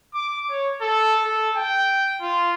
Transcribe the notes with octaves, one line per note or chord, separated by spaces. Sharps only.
D6
C#5
A4
A4
G5
F4